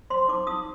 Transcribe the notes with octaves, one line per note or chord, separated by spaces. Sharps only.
C5 C6
D#4 D6
D#4 D#6